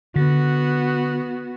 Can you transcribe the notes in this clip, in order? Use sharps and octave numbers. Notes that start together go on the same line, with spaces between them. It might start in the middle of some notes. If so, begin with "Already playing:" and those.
D3 B3 F#4